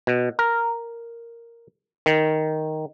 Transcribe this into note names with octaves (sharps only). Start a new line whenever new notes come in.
B2
A#4
D#3